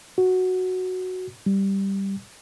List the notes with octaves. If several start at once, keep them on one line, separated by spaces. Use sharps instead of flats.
F#4
G3